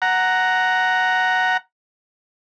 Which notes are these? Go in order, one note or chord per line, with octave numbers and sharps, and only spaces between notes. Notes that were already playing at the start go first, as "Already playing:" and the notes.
F#5 A#5